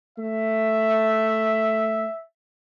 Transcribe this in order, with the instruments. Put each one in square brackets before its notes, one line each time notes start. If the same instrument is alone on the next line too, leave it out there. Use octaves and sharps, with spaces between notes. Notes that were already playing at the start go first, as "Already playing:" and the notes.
[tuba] A3 [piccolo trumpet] E5